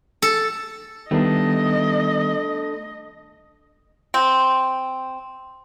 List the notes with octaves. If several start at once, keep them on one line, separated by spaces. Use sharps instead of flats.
A4
D#3 G3 A3 B3 D4 D#5
C4